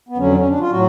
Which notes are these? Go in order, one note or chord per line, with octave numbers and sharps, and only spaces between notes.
B3
F2 D3 F#3 C#4
C#4
D4
F4
A2 F#3 F#4